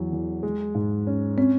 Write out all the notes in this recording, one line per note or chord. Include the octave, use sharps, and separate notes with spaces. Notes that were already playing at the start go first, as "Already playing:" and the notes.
Already playing: E2 F#3
E2
G#3
G#2
C#4
C4 C#4